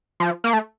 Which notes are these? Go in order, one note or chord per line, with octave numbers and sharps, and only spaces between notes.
F3
A#3
A3